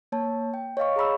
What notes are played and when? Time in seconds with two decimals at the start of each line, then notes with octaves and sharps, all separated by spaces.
0.12 A#3 C#5 A5
0.54 G5
0.77 C#5 D#5 F5 C#6
0.96 G#4 A#5 B5 E6